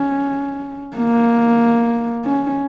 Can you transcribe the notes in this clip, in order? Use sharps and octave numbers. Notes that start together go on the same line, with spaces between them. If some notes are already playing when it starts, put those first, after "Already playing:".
Already playing: C#4
A#3
C#4